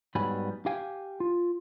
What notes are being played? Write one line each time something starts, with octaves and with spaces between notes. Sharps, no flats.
G#2 F#3 G3 B3 G#5 B5
G4 F5 G5 G#5
F4